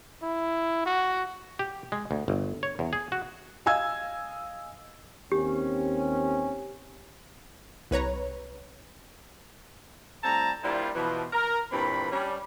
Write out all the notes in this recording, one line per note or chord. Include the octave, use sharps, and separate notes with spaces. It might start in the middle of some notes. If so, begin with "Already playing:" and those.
E4
F#4
G4
G#3
D2
G1
C#5
E2
G#4
F#4
D#5 F5 G#5 E6 G#6
D#2 C4 C#4 G4
C2 B4 C#5 A#5
A2 G3 C4 A5 A#5
G3 A#3 D4 E4 F4 C5
B2 E3 F3
A#4
G2 A#2 E3 C4 B5
G3 C#4 D4